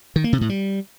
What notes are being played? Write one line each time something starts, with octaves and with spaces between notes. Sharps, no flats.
D#3
A#3
C3
A2
G3